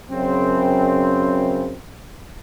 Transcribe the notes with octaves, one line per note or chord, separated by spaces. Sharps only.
F#2 C#3 C4